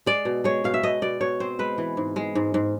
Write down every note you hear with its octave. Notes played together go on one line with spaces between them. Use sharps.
G#3 D5
B2
G#3 C#5
B2 F5
E5
B2 D#5
B2 D5
B2 C#5
C4 C5
G#3 B4
E3
G#2
G#3
G#2
G#2